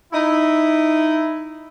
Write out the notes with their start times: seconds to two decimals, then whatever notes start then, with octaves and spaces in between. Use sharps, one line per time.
0.12 D#4 E4